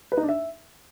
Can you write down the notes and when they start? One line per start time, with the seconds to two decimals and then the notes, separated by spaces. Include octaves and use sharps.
0.12 B4
0.17 D#4
0.23 D4
0.29 E5